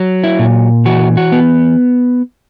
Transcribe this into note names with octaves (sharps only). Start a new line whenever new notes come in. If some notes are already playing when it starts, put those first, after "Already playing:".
Already playing: F#3
E4
A#2
E3 F#4
F#4
B3